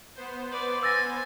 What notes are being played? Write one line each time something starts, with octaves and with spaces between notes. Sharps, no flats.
B3 C5
B4 D5
G#5 E6 A6 A#6